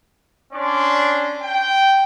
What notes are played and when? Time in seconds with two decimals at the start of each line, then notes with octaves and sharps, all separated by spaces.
0.52 C#4 D4 D5 C6
1.43 G5